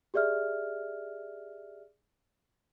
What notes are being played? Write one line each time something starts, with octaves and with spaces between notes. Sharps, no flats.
G4 G#4 D5 E5 F6